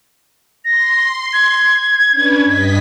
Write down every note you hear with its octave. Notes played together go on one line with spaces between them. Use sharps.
C6 A#6
G#6
C#4 D4 B4
G2 D#5 B6